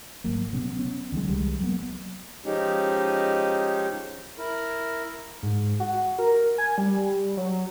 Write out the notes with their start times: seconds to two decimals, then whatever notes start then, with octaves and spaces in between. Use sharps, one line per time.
0.24 G#1 F#3 A#3
0.53 C3 F#3 B3 C#4
0.77 B3 C#4
1.12 D3 D#3 F#3 G#3
1.29 C2 G3 G#3
1.60 F#3 G#3 A#3 B3
2.45 F3 G#3 C#4 D#4 G4
4.38 E4 A#4
5.43 G#2
5.80 F#4
6.18 A#4
6.58 G#5
6.78 G3
7.37 F#3